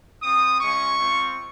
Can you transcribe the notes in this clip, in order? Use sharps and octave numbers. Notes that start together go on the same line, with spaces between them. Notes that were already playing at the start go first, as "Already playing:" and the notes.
C4 F4 D#6
G#3 C#4 F4 C#6
G#3 C4 F4